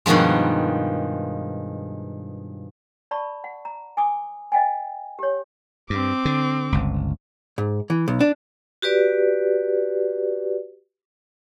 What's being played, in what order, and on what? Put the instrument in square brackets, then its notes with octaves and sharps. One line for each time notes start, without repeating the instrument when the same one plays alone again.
[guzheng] G2 B2 D#3 F3 G#3
[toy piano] D5 A5 B5 C#6
F#5
A#5
G#5 D6 D#6
D#5 F5 G5 G#5
G4 C#5
[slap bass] G2 [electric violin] C4 D6
[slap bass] D3
G1 C#2
[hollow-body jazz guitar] G#2
E3
B1
D4
[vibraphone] F#4 G4 B4 D5